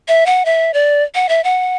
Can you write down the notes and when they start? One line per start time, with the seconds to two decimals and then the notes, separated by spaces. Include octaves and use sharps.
0.08 E5
0.26 F#5
0.45 E5
0.74 D5
1.15 F#5
1.29 E5
1.44 F#5